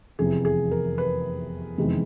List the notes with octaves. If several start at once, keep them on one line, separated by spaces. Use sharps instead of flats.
F1 E2 C3 E3 G#4
G#4
A#4
B4
F1 E2 C3 D#3 G#3